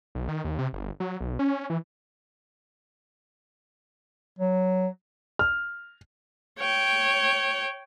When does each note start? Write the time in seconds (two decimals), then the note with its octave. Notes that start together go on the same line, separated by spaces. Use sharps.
0.15 B1
0.29 D#3
0.44 D#2
0.59 C3
0.73 G1
1.00 F#3
1.20 B1
1.39 C#4
1.70 E3
4.39 F#3
5.39 F6
6.60 C#5 G5